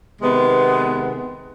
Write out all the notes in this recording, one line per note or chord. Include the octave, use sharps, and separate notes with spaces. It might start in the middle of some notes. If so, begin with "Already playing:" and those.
C3 D#3 G#3 B3